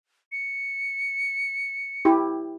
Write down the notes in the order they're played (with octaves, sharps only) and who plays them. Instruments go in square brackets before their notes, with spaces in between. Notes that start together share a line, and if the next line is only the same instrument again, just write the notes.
[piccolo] C#7
[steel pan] E4 G4